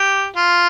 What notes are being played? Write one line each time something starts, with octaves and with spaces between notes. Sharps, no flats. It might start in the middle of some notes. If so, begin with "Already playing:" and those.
Already playing: G4
F4